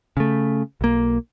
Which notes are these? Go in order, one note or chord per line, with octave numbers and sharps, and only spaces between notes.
C#3 A3
B1 A#3